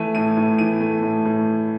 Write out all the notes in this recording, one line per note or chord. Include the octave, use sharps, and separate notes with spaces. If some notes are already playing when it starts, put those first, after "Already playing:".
Already playing: E3 A3 D#7
A2 D#7
A2
E3 D#7
A3
A2
A2